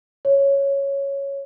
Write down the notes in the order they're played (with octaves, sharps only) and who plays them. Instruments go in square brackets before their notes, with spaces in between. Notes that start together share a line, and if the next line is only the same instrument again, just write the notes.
[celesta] C#5